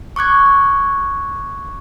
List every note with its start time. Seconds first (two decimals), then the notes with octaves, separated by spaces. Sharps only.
0.16 C#6 D6 F#6 G#6